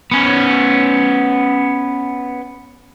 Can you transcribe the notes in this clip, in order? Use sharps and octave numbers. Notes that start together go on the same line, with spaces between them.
B3 C#4